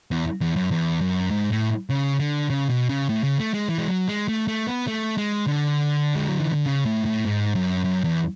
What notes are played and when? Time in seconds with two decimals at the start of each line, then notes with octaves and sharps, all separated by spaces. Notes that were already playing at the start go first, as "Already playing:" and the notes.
0.11 E2
0.41 E2
0.56 F#2
0.71 E2
1.01 F#2
1.31 G#2
1.51 A2
1.90 C#3
2.19 D3
2.50 C#3
2.69 B2
2.89 C#3
3.09 A2
3.24 C#3
3.39 A3
3.54 G#3
3.68 E3
3.78 G#3
3.88 F#3
4.08 G#3
4.28 A3
4.48 A3
4.67 B3
4.88 A3
5.17 G#3
5.47 D3
6.15 G#3
6.28 F#3
6.40 E3
6.53 D3
6.66 C#3
6.85 A2
7.06 A2
7.25 G#2
7.55 F#2
7.85 F#2
8.04 E2